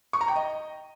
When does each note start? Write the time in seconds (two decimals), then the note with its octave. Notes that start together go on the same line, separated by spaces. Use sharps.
0.13 C#6
0.21 A#5
0.28 G5
0.36 D#5